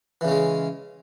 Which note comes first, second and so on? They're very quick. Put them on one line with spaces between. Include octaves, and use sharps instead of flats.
E3 C#3 C#4 G#3